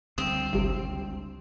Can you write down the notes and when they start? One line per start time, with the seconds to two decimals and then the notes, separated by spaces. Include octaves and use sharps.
0.18 C#2 D3 G3 C4 D#6
0.53 G1 C2 C3